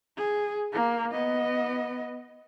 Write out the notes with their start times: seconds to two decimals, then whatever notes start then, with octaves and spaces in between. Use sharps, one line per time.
0.17 G#4
0.73 A#3
1.13 B3 D#5